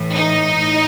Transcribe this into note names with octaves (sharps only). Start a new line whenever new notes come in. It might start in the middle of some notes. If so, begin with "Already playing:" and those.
Already playing: A2 E3
D#4
A2